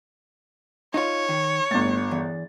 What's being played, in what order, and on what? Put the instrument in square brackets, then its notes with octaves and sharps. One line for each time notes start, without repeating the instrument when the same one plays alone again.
[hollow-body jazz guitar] D#4 F4 [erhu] C#5
[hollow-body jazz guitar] D#3
[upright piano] G1 A6 [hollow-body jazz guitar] A2
[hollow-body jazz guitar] E2